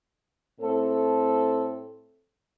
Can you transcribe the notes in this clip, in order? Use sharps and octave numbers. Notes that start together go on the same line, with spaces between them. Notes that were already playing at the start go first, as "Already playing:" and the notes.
A2 C4 A4